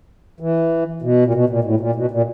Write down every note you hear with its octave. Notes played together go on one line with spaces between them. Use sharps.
E3
B2
A#2
B2
A#2
A2
A#2
B2
A#2